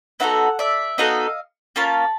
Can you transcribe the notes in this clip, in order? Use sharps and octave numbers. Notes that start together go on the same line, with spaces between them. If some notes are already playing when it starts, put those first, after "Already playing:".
B3 D#4 F#4 A4 E5 F#5
D5 E5
B3 D#4 F#4 A4 D#5 F5
A#3 C#4 F4 A5 B5